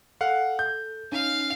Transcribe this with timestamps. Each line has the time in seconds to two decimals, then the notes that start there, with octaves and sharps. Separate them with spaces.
0.21 A4 F5 F#5
0.59 G6
1.12 C#4 D#4 F5